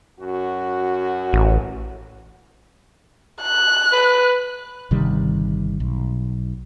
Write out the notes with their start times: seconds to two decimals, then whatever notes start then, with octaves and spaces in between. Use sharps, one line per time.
0.20 F#2 F#4
1.33 A1
3.42 F#6
3.92 B4
4.91 G1 C3 D#3 G3
5.80 B1